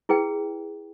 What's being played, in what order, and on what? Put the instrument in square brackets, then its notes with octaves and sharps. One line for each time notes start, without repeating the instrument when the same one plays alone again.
[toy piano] E4 G#4 B4 G5